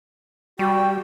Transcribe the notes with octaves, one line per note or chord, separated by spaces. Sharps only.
G3 F#4 G5